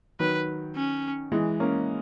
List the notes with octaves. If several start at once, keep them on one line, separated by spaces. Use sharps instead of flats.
D#3 F#3 B4
C#4
E3 G#3
A#3 C#4